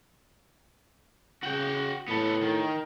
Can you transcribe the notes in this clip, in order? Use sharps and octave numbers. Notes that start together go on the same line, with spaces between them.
C#3 F#4 G5
A2 B3 A4
D#3